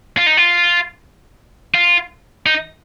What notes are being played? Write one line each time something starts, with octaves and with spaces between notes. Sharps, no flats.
F4
D#4
F4
F4
D#4